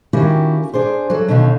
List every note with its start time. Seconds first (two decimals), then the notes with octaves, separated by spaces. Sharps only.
0.13 D#3 A#3 C#4 E4 F#4 G4
0.74 D4 G#4 C5
1.10 F#3 A4
1.28 B2 D3 D#3 C#4 D#4 F5